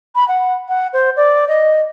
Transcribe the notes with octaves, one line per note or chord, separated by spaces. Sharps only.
B5
F#5
F#5
C5
D5
D#5